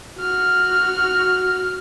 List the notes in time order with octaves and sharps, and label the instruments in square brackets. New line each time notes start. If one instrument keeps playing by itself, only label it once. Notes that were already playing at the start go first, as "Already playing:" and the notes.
[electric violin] F#4 F6